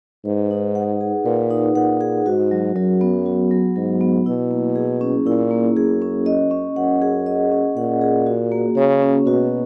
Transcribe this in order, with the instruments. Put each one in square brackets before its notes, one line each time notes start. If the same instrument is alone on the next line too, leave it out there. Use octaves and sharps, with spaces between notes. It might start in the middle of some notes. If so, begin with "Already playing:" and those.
[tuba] G#2 [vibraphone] B4
[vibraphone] D#4
F#5
G#4
[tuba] A#2 [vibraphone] B4
[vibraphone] D#4
[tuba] A#2 [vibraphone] F#5
[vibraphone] G#4
[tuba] G#2 [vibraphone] F#4
[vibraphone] F#3
[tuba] F#2 [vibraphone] F#3
[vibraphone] B3
F#4
F#3
[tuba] G#2 [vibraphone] F#3
[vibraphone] B3
[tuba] B2 [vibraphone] E4
[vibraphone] A#3
G#4
C#4
[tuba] A#2 [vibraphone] E4
[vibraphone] A#3
[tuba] F#2 [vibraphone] G#4
[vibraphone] C#4
D#5
C#4
[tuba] F#2 [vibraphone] F#5
[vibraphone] G#4
D#5
C#4
[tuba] A#2 [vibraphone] F#5
[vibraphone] G#4
F#4
A#3
[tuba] C#3 [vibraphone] C#5
[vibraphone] C#4
[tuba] B2 [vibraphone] F#4